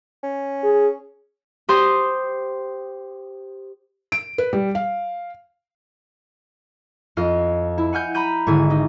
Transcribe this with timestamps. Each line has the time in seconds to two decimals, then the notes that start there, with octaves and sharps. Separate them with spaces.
0.23 C#4
0.64 G#4
1.69 G4 C5 C6 D#6
4.12 D7
4.38 B4
4.53 G3
4.75 F5
7.17 F2 F4 D#5 F6
7.78 E4
7.93 F#5 G#5 F6 G6
8.14 A#5 B5 G6 D#7
8.47 G#1 G#2 D3 E4 G#5
8.70 D#4